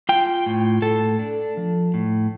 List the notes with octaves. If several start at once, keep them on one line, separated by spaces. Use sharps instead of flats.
F4 G5
A2
A2 A4
D4
F3
A2